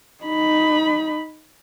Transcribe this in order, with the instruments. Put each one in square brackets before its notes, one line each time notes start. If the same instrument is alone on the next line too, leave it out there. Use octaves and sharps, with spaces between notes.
[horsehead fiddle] D#4 B5